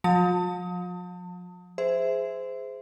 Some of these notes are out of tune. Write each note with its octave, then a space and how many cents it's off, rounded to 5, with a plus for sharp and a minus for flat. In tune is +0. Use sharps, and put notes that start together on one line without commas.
F3 +40 A5 +30 D#6 +25
G#4 +0 C5 -20 E5 +0